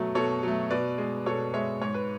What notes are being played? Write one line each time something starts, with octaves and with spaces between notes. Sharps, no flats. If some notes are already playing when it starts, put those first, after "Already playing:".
Already playing: B2 F#3 A3
B2 A4 C#5
F#3 A3
B2 B4 D5
G#3
B2 A4 C#5
G#3 C#5 E5
G#2 C#5
B4